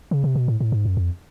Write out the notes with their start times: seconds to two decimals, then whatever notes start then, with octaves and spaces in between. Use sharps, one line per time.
0.11 C#3
0.24 C3
0.35 B2
0.48 A2
0.60 A2
0.72 G#2
0.85 F#2
0.97 F2